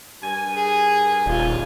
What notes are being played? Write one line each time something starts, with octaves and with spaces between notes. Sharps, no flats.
G2 A#4 G#5
G#4
D#1 F4